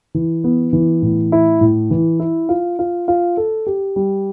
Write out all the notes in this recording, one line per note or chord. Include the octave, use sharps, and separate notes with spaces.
E3
B3
E3
A2
E4
A2
E3
E4
F4
F4
F4
A4
G4
G3